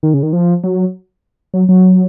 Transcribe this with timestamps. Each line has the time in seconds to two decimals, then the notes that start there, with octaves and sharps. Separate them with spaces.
0.03 D#3
0.14 C#3
0.23 D#3
0.33 F3
0.64 F#3
1.54 F#3
1.69 F#3